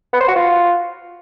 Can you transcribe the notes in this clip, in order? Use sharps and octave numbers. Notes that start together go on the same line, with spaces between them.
B3
C5
F#4
F4